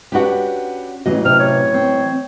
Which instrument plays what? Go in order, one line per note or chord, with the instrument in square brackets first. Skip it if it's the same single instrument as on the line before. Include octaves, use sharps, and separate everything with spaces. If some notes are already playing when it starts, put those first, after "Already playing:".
[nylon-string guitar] C#4 D4 F#4 [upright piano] G4 B4 F#5
[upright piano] A1 E3 F#3 [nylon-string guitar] D#5
[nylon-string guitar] C3 [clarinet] F6
[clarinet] C#5
[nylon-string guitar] C4